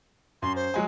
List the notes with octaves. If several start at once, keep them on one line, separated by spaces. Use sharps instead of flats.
F#2 C6
C5
F#3 G#3 G#5